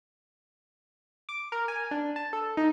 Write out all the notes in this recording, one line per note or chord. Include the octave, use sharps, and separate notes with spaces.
D6
A#4
G#5
D4
A5
A4
D#4